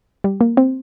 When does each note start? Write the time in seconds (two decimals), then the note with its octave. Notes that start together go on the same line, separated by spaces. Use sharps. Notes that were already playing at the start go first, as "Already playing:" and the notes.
0.24 G3
0.41 A#3
0.57 C4